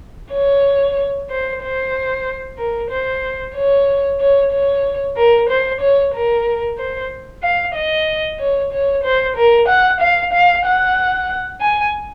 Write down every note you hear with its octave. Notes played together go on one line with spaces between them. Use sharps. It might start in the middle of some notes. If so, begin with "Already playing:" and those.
C#5
C5
C5
A#4
C5
C#5
C#5
C#5
A#4
C5
C#5
A#4
C5
F5
D#5
C#5
C#5
C5
A#4
F#5
F5
F5
F#5
G#5